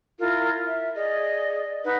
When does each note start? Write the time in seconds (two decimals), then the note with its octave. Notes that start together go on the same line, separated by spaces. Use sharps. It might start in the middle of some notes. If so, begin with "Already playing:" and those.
0.19 E4 F4 A#4
0.66 E5
0.95 G#4 D5 D#5
1.85 D#4 B4 F#5